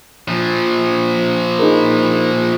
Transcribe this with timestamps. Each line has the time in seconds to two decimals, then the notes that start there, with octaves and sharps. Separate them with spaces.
0.28 A#2 F3
1.59 D#4 G#4 A#4